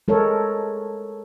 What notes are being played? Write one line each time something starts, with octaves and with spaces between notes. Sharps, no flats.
G#3 A4 A#4 C#5